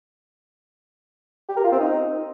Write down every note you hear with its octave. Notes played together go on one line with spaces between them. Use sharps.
G4
A#4
F4
C4
D#4